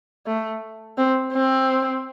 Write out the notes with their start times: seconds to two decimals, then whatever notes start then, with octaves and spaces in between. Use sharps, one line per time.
0.26 A3
0.98 C4
1.33 C4